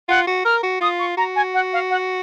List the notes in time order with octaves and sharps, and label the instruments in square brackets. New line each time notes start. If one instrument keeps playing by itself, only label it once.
[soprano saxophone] F4 [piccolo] F#5
[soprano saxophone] F#4
[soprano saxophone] A#4 [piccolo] F6
[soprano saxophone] F#4
[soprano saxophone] F4 [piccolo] D#6
[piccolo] C#6
[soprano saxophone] F#4 [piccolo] A#5
[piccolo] G#5
F#5
F5
F#5